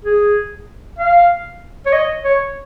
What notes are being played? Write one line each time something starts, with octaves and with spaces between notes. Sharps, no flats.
G#4
F5
C#5
D#5
C#5